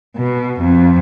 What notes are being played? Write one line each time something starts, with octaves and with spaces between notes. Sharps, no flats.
B2
F2